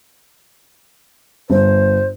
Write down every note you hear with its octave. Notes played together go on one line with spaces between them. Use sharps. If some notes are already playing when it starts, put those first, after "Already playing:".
G1 C5